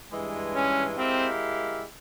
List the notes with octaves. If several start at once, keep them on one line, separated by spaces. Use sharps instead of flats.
G2 E3 G#3
C#4
G#3 C4 E4 G4 A#4 F5